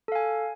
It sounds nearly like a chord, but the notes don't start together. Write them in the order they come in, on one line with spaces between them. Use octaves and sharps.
A4 F5 G#5